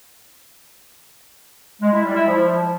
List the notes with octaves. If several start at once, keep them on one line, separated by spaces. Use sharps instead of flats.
G#3
E4
G3
E4
F3